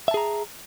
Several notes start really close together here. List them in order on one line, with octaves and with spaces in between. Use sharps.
E5 A5 G#4 A#5